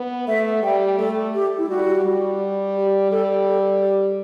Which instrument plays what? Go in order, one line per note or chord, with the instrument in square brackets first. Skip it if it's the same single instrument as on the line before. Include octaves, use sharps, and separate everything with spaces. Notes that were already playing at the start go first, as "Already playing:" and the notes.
Already playing: [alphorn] B3
[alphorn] A3 [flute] E5
[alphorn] G3 [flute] G5
[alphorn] A3 [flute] A4
[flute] G4
E4
[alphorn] G3 [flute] F#4
[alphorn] G3
[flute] G4
[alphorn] G3 [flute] A4
[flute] A4
G4